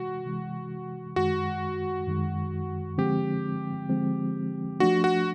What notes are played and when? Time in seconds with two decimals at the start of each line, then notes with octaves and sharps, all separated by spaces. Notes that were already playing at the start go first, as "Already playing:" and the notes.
Already playing: C3 E3 G#3 F#4
0.25 C3 E3 G#3
1.16 F#2 D#3 G#3 F#4
2.08 F#2 D#3 G#3
2.98 D3 F3 G#3 C4 G4
3.89 D3 F3 G#3 C4
4.80 F3 A3 D4 F#4
5.04 F#4